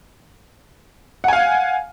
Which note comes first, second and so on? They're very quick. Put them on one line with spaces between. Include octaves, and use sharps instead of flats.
F#5 G#5 F5